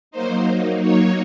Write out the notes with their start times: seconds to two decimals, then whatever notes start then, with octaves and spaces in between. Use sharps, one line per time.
0.11 F#3 A#3 D#4 C5
0.82 C#5